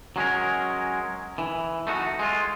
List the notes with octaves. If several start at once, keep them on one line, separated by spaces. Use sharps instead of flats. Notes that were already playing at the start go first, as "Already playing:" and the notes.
F#3 G#3 C#4 A#4
E3
A3 D#4 F#4
G#3 F4